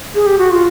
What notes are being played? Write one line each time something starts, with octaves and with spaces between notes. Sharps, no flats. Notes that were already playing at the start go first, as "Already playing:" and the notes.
G#4
G4
F#4
F4